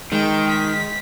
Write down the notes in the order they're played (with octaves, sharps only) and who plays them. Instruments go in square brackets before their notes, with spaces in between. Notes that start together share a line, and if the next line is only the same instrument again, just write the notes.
[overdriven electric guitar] D#3 [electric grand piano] G#3 [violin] G5
[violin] B6